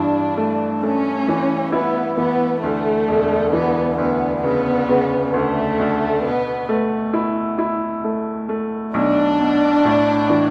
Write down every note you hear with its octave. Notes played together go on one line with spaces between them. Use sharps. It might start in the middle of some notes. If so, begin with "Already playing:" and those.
Already playing: G2 E3 D4
A3
A3 C#4
E3
B3 E4
E3 B3
D2 A3
E1
E3 B3
D2 B3
C#3 B3
C#3
D2 A3
D2
B2 B3
A3
E4
E4
A3
A3
B1 D4
B2
A2
E3